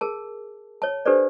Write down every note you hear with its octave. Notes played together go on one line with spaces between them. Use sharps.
G#4 A#4 A5
C#5 A5
D4 G4 A4 B4 C5 D5